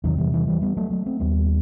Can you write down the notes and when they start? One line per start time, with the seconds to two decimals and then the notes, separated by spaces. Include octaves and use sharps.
0.04 E2 C3 D#3 F#3
0.18 E3 G3
0.33 E3 G3
0.47 E3 G3
0.62 G3 B3
0.77 F#3 A3
0.91 F#3 A3
1.06 A3 C4
1.20 D#2 G3 B3